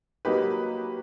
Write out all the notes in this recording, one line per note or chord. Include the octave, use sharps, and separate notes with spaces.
F#3 A#3 D#4 G4 B4